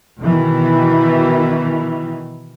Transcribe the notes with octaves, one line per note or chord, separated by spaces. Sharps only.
B2 D#3 E3